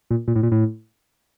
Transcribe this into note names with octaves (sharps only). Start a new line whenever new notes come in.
A#2
A#2
A2
A#2
A2